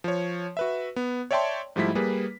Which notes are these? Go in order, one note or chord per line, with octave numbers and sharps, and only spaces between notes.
F3 C#5
F#4 B4 E5
B3
C#5 D5 E5 G5 A5 C6
G#2 F3 G3 A3 E4 B6
G3 A#3 G#4 B4